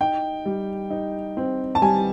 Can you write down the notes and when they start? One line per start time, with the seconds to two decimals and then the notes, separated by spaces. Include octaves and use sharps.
0.01 D#4 G5
0.45 G3
0.90 D#4
1.37 C4
1.75 A5
1.82 G3 G#5